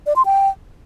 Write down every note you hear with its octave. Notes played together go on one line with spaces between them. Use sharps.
D5
C6
G5